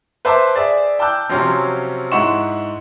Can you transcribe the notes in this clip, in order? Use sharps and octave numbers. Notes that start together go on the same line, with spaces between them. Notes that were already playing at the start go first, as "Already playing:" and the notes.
B4 C5 E5 A5 D6
G#4 D5 E5
G5 A5 D6 E6 F#6 G6
C3 F3 F#3 C4 C#4
G#2 E4 F#5 C6 C#6 E7